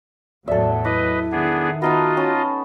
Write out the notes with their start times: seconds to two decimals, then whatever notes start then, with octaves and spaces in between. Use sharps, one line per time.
0.48 E2 A2 F#3 A4 D5 E5
0.85 E4 B4 D#5 D6
1.32 D#3 B3 D4 G#4
1.82 B3 D#4 F4 F#4 D#5 A5
2.17 C#4 A5 B5